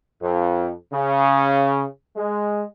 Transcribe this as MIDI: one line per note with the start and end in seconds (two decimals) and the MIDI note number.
0.22 0.71 41
0.93 1.83 49
2.16 2.64 56